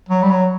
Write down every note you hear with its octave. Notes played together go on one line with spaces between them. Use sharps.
F#3
G3
F#3